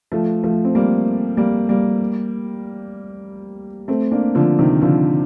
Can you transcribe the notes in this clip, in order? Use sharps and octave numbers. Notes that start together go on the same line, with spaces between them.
F3 A3
F3 A3
C4
G3 A#3
G3 A#3
G3 A#3
A3 C4
A#3 D4
D3 F3
C3 D#3
D3 F3